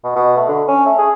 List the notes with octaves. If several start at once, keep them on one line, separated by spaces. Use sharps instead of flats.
B2
B2
A3
D3
C#4
A3
G#4